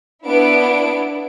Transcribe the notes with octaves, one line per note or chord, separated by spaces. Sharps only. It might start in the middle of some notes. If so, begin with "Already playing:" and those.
B3 D4 E4 D7